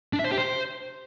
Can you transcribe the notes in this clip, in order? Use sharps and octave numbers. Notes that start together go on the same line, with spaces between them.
D4
E5
C5
G4
C5